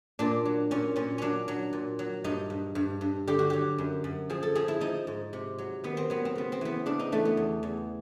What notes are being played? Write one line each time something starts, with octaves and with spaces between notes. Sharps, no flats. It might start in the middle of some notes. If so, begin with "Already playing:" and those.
A#2 D4
F#3
A#2 C#4
A#2 C#4
F#3 C#4 D4
F#3
A#2
F#3
G2 D#4
G2
G2
G2
D3 G4
F#4
F#3 G4
F#2
F#2
F3 G#4
A4
F3 G#4
E4
F3 D#4
G#2
C3
F#3
D#3 B3
C4
F#3 B3
C4
C#3 B3
C4
E3 B3
C#3 D4
D#4
E3 A3
B3
E2
E2